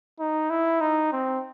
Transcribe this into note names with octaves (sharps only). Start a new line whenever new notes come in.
D#4
E4
D#4
C4